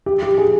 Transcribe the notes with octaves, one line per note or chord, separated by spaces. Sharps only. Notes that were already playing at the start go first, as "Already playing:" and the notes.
G4
G4
G#4